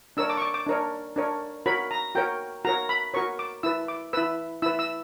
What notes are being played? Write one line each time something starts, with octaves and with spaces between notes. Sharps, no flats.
D4 A#4 C#5 E6
D6
C#6
D6
D6
D4 A#4 C#5
D4 A#4 C#5
F#4 A#4 C#5 B5
A#5
F#4 A#4 C#5 G5
F#4 A#4 C#5 A#5
B5
F#4 A#4 C#5 C#6
D6
E4 B4 E6
D6
E4 B4 E6
E4 B4 E6
E6